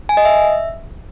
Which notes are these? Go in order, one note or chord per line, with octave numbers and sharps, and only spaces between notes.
G#5
D#5
E5